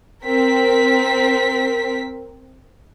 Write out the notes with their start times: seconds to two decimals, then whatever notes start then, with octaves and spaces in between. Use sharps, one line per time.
0.24 C4 A#4 B6